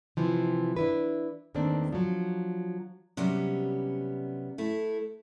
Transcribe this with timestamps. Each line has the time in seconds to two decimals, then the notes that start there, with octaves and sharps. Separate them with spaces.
0.17 C3 E3 F3
0.76 D4 E4 B4
1.54 E2 D#3 A3 A#3 C4 D4
1.93 F3 F#3
3.17 C3 F#3 G3 B3 C#4
4.58 A3 E4